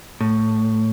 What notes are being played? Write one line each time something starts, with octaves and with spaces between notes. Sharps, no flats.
A2